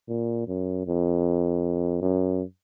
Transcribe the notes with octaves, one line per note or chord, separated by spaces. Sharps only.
A#2
F#2
F2
F#2